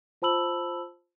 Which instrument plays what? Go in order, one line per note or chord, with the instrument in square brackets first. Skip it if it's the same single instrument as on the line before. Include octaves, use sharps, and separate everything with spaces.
[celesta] F4 C5 A5 B5 E6 F#7